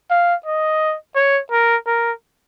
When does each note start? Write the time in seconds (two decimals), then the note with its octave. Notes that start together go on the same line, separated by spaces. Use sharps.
0.10 F5
0.46 D#5
1.15 C#5
1.52 A#4
1.87 A#4